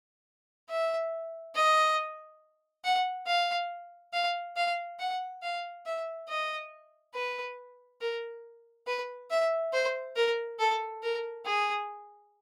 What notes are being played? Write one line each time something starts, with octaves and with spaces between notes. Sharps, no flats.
E5
D#5
F#5
F5
F5
F5
F#5
F5
E5
D#5
B4
A#4
B4
E5
C5
A#4
A4
A#4
G#4